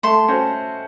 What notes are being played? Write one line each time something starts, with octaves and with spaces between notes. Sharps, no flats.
A3 A5 C6
C#4 F#4 C5